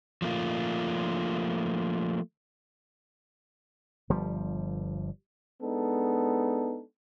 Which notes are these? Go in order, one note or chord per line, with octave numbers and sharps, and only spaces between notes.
F3 A3 A#3 F4
G1 F3 G3
G#3 B3 D4 D#4 A4